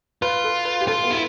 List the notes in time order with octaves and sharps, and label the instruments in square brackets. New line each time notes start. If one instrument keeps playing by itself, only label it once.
[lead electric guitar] F4 [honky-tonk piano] B4
[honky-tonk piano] A4
B4
G4
[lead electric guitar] F4 [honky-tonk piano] A4
[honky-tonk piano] B3
[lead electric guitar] E4